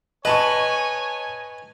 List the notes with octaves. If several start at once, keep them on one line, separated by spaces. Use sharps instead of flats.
B4 C#5 D#5 G#5 A5 C#6